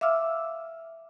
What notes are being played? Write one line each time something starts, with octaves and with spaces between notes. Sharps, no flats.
E5 F5 D6 E6 F6